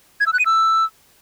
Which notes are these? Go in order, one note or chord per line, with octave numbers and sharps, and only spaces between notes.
G#6
E6
F#6
D#7
E6